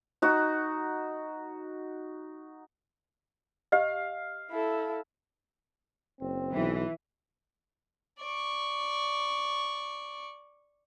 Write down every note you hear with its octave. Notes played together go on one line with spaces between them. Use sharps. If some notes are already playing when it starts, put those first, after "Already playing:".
D#4 F#4
G4 D#5 F5
E4 A4
F#1 C4
B1 E3
D5 C#6